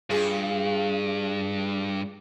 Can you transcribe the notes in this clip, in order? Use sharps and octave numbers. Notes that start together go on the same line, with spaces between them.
G2 F4 G#4